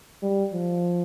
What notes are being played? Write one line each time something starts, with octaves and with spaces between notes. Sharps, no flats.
G3
F3